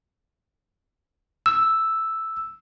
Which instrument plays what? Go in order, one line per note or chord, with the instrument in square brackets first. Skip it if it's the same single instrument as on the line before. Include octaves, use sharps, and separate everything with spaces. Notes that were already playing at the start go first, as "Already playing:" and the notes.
[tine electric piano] E6